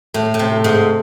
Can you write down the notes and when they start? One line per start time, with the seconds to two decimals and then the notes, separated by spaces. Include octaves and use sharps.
0.14 A2 A3
0.34 A2
0.39 C3
0.52 A3
0.64 G#2